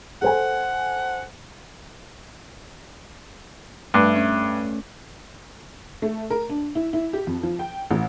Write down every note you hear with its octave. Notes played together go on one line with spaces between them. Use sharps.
A4 C5 F#5 G#5
G2 A3
C#4
A3
A#4
D4
E4
E4
G4
F2
F3
G5
A1